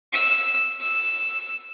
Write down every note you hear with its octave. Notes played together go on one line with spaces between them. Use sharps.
E6
E6